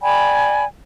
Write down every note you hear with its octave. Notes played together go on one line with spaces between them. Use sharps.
D5 G5 G#5 B5